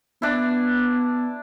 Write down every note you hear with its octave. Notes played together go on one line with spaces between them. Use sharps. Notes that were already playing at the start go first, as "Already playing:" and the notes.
B3 D4 E4